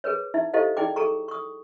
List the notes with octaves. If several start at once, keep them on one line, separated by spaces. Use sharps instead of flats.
G#4 A#4 B4 C#5
D#4 E4 E5
E4 G4 A4 C5 D#5 F5
D#4 E4 G#4 D5 G5 D6
G#4 A4 A#5 C#6
C#6 D#6